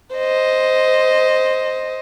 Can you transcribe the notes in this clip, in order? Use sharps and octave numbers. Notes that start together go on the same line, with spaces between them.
C5 D#5